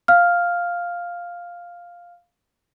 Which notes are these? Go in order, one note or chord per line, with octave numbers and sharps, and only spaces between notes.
F5 F6